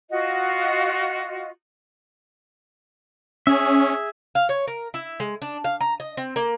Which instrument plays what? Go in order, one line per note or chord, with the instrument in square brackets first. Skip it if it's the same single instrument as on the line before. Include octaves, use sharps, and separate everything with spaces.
[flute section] F4 F#4 D#5
[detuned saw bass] C#4 [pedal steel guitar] G#4 E5
[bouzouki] F5
C#5
A#4
E4
G#3
D4
F5
A#5
D#5
C4
A#3